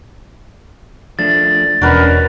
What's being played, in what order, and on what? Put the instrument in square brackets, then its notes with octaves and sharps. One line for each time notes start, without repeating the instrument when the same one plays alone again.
[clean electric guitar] F3 A3 D4 [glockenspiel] A6
[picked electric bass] E1 [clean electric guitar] C#4 D4 [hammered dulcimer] F#4 A#4 B4